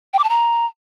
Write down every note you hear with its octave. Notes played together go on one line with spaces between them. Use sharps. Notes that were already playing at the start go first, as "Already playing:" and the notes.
G5
D6
A5
A#5